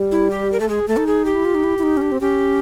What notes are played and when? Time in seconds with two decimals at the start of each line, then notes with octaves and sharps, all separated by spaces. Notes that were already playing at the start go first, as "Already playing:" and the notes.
Already playing: G3
0.12 E4
0.31 G4
0.52 A#4
0.60 A3 A4
0.69 G#3 G#4
0.87 A3 A4
0.97 D#4
1.07 G#4
1.25 G4
1.35 E4
1.45 F4
1.55 D#4
1.64 E4
1.78 E4
1.83 D#4
1.97 C#4
2.02 D4
2.12 C4
2.21 C#4 G4